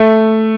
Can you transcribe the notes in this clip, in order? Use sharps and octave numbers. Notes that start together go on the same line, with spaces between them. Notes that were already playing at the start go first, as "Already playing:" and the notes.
Already playing: A3